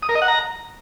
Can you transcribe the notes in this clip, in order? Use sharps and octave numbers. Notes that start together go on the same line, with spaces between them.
D#6
A#4
D#5
F#5
A#5